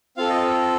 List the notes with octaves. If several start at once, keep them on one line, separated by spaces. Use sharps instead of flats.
C4 F4 A4 F5
D#5